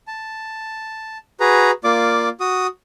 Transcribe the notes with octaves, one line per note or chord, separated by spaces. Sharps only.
A5
F#4 G#4 B4 A#5
A#3 F4 D5 D6
F#4 D#6